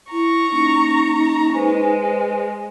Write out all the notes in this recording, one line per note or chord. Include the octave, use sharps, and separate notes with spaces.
E4 A#5 C#6
A#3 C#4 D#4
G#3 B4 C5 G#5